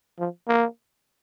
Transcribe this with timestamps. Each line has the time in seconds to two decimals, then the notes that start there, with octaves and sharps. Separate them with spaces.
0.19 F3
0.48 A#3